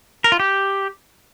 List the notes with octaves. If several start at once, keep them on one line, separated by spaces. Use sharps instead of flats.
A#4
F4
G4